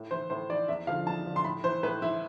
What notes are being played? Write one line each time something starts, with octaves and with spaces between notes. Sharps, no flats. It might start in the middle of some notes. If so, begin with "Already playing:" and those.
Already playing: A2
E3 C5
A2 C5
E3 D5
E2 E5
D3 F3 F5
E2 A5
D3 F3
C6
A2 B5
E3 C5
A2 B4
E3 E4